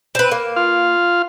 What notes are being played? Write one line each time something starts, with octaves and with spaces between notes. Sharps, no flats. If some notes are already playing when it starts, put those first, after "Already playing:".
C4 B4
A#3
F4 F5